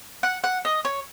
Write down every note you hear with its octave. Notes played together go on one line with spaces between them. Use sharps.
F#5
F#5
D#5
C#5